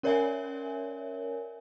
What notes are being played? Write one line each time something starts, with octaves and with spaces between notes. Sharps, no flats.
C#4 A#4 C#5 D5 E5 G#5